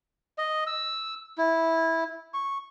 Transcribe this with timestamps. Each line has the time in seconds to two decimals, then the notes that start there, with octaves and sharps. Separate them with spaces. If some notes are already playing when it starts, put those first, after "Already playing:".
0.38 D#5
0.67 E6
1.38 E4
2.34 C#6